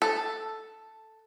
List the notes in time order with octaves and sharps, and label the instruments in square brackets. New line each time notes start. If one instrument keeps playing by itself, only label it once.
[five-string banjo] A4